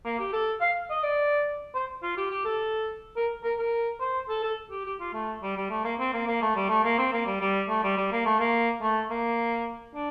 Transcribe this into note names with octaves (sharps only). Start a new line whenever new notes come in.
A#3
G4
A4
F5
D#5
D5
C5
F4
G4
G4
A4
A#4
A#4
A#4
C5
A4
A4
G4
G4
F4
A3
G3
G3
A3
A#3
C4
A#3
A#3
A3
G3
A3
A#3
C4
A#3
G3
G3
A3
G3
G3
A#3
A3
A#3
A3
A#3
D4